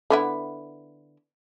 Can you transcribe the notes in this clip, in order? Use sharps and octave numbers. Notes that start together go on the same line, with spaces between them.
D3 B3 E4